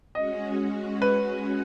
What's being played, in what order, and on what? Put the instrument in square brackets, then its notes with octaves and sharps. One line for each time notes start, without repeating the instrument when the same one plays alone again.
[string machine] G#3 C#4 F#4 [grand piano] D#5
[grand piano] B4